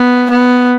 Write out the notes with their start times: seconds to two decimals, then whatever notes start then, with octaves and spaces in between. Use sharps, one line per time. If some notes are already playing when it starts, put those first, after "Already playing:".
Already playing: B3
0.30 B3